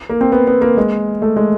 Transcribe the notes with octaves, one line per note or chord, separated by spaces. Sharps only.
A#3
C4
B3
B3
A#3
G#3
A3
G#3